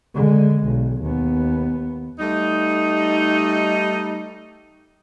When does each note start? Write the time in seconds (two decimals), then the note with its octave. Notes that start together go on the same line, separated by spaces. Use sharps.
0.15 D3 G#3
0.65 B1
1.02 D#2 B3
2.19 G3 A3 D#4